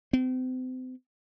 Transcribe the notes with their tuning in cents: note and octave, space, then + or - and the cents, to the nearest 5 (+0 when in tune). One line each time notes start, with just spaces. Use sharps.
C4 -35